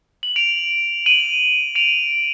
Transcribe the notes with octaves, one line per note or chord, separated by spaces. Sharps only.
F#7
D7 F7
D#7 F#7
D7 F7